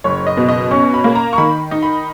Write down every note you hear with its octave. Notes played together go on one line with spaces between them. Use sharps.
F#1 C#5
D#5
B2
D#5
C#4 C#6
B5
A#3
A#5
C#6
D#3 B5
D#4
B5